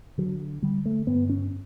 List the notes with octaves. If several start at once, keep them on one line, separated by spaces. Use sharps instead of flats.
D3 F#3
D3 G3
A3
G2 B3
C#4